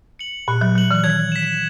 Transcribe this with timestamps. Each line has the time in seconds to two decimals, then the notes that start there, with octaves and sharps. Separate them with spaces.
0.19 C#7 F#7
0.48 A#2 F#6
0.61 F#3
0.76 F#3 C#7 F#7
0.91 E3
1.04 D#3 G#6
1.32 B6 E7